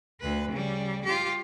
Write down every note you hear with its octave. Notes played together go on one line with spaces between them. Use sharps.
D2 B4
C#3 G3
F4 G4